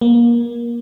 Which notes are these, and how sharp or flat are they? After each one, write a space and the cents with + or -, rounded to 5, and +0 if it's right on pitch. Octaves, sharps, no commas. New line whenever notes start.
A#3 +25